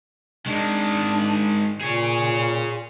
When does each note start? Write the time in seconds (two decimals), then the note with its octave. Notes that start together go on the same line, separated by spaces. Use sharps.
0.47 D#3 G#3 D4
1.81 A#2 G#4 C#5